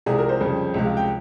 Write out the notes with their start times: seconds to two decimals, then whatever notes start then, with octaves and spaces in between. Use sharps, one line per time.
0.06 C2 C3 F3 G#3 G#4
0.18 A#4
0.29 C5
0.40 F2 C#3 G3
0.74 C#2 C3 F3 G#3
0.85 F5
0.97 G5